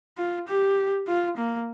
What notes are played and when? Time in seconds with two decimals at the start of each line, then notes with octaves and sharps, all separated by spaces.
0.18 F4
0.48 G4
1.08 F4
1.37 A#3